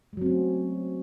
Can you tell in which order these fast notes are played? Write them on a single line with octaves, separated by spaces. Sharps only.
G#3 F#3 C4 C#4 A3